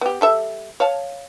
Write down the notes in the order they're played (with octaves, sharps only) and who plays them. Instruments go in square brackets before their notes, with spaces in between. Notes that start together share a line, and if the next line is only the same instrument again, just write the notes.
[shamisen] B3 G4
G3 A4 E5
C#5 F5 A5